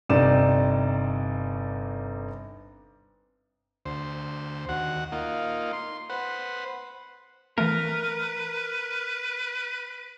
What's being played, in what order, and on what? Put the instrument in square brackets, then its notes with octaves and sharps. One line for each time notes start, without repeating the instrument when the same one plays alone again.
[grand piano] G1 C3 D#4 D5 E7
[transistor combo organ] D2 C5
D#2 F#4 F#5
A#3 D#4 F4
C6
B4 C5 F#5
[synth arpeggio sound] E3 A3 [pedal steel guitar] A#4 [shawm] B4